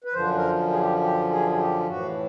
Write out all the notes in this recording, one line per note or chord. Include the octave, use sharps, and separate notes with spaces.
B4
F#2 D3 F3 C5
A#4
G#4
G4
G4
G#4
G#4
G4
A2 E3 F#4